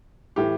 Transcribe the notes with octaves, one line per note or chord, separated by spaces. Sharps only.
A2 E3 G4